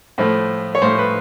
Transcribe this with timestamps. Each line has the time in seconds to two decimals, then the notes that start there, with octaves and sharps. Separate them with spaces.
0.18 A2 F3 A3
0.75 C#5
0.82 A2 F3 A3 C5
0.98 B4